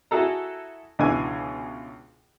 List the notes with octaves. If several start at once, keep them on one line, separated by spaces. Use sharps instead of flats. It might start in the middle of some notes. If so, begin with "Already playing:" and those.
E4 F#4 G#4 A4 A#5
C#2 B2 D3 E3 G#5